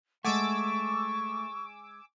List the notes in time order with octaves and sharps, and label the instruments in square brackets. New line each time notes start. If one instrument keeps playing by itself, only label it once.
[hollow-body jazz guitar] G#3 F#5 [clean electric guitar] A3 [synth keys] G#5 D6 E6 [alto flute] C#6